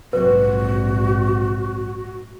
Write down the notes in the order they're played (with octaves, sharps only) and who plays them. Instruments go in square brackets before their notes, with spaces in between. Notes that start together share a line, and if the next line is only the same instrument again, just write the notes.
[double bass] A#1 G#2 [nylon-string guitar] C3 F#3 C4 [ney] F#4 [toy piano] B4